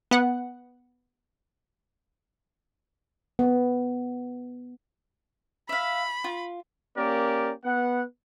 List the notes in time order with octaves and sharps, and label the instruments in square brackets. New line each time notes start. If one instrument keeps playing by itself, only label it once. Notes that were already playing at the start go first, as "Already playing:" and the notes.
[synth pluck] B3 F#5
[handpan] B3
[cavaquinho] E5 F5 [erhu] B5
[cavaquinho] F4
[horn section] A#3 C#4 G4 A#4 D5
B3 F#5